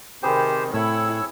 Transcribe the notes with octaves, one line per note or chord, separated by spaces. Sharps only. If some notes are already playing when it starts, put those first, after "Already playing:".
C3 D#3 C4 G4 G#4 B4 C5
A2 E4 A4 C#5 E6